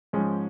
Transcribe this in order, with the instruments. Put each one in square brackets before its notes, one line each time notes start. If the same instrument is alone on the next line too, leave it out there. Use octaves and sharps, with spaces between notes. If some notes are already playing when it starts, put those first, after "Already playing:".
[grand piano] G#2 F3 G#3 C#4